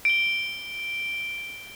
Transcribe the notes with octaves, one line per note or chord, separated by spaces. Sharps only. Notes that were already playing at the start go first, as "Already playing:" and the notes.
D7 G7